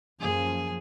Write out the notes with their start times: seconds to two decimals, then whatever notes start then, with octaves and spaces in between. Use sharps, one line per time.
0.21 F#2 F3 A#3 G#4 G#5